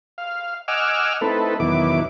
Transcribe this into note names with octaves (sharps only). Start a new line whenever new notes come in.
F5
D#5 F#5 G#5 D6 E6 F6
A3 C4 D#4 E4 A4 B4
E2 B2 D#3 F#3 E4 D6